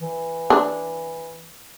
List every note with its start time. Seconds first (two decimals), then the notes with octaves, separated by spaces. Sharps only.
0.01 E3
0.50 D4